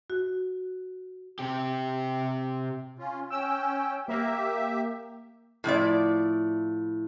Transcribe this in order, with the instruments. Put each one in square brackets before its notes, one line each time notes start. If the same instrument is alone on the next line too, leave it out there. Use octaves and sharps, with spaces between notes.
[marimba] F#4
[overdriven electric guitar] C3 G4
[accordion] C#4 F4
[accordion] C#4 G5 [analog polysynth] E6
[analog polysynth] A#3 [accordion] G4 E5
[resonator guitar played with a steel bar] A2 F3 E4 D5